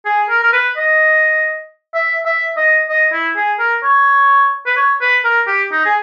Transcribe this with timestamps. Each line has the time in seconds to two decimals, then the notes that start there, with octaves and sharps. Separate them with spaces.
0.05 G#4
0.29 A#4
0.43 A#4
0.53 B4
0.77 D#5
1.94 E5
2.26 E5
2.57 D#5
2.89 D#5
3.12 E4
3.36 G#4
3.59 A#4
3.83 C#5
4.66 B4
4.77 C#5
5.01 B4
5.24 A#4
5.47 G4
5.72 D#4
5.85 G#4